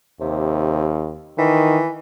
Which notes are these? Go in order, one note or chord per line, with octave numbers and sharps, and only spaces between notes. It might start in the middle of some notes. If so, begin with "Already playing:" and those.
D#2 C3
D#3 E3